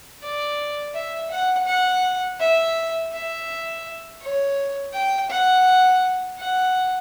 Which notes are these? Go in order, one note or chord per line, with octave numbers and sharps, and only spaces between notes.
D5
E5
F#5
F#5
E5
E5
C#5
G5
F#5
F#5